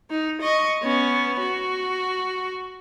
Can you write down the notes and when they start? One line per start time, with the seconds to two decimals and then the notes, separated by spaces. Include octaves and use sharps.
0.10 D#4
0.41 D#5 C#6
0.83 B3 C#4
1.40 F#4